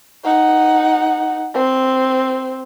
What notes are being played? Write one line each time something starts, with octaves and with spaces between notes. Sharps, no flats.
D#4 F#5
C4